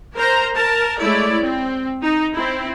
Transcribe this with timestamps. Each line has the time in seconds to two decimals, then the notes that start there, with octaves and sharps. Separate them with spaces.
0.16 A#4 C5 A#5
0.54 A#4 A5
1.00 G#3 A3 E4 C#5 D5
1.43 C4
2.02 D#4
2.35 C4 E4